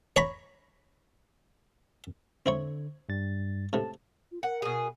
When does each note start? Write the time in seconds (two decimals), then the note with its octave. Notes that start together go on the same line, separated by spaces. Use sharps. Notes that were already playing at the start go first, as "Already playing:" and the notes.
0.16 C#5 A#5 B5
2.46 D3 C4 E4 C#5
3.09 G2 G3 A6
3.73 A2 C3 A5
4.31 F4
4.43 A#4 F#5
4.62 B2 G#4